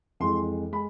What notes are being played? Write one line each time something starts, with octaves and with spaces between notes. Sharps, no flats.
F2 E3 G#3 C6
G#3 B5